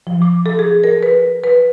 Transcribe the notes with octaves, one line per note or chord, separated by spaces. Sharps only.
F3
D6
A4
G#4
A#4
B4
B4